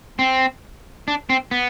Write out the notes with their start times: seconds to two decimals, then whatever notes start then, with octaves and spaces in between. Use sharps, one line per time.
0.19 C4
1.08 D4
1.30 C4
1.51 B3